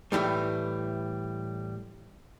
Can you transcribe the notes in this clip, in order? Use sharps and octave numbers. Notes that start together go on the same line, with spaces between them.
A2 C3 E3 G3 A3